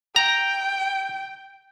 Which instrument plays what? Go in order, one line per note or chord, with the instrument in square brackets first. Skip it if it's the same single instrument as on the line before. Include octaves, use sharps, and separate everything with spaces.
[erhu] G5 [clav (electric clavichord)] A#5